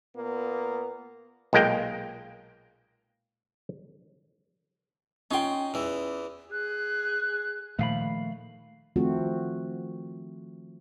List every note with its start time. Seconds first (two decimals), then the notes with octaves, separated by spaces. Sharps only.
0.15 A#2 A#3 B3
1.53 B1 A#2 G#3 A#3 G5
5.31 C#4 D#4 F4 G5 C6
5.74 E2 E3
6.52 G#4 F#6
7.79 A#2 D#3 F3 A3 F5 B5
8.96 D#3 F3 A3 C4 F#4